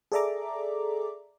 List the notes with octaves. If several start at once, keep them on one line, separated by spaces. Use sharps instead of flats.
G#4 A4 D5 E5 A#5 D6